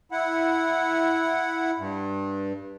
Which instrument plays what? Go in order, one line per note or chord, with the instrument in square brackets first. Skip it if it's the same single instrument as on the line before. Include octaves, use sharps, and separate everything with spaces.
[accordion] E4 F#5
G2